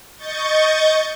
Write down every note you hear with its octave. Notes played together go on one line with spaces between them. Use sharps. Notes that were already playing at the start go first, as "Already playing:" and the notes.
D#5 C#6 G6 A6